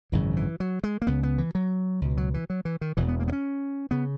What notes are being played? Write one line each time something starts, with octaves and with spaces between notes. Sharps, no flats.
G#1 F#2 C#3 E3
E3
F#3
G#3
A#3
C#2 C#3 B3
B3
E3
F#3
C#2 B2
F#3
E3
F#3
E3
D#3
E1 E2 B2 E3
B3
A#3
B3
C#4
C#3 B3